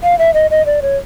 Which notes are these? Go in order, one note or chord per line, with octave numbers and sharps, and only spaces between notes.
F5
E5
D#5
D#5
D5
C#5